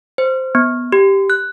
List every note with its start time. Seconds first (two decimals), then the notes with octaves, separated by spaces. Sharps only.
0.18 C5
0.55 B3
0.92 G4
1.30 F#6